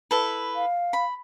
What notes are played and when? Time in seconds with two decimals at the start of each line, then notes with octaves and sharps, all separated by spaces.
0.11 E4 A4 B4
0.55 F5
0.93 B5